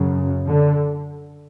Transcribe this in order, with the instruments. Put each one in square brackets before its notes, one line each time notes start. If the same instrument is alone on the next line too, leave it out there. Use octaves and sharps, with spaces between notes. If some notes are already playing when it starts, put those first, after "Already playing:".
Already playing: [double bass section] F#2 C#3
D3